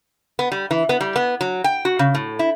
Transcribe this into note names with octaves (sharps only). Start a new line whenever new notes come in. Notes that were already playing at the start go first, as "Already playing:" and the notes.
B3
G3
E3
B3
G3
B3
F#3
G5
F#4
C#3
A2
E4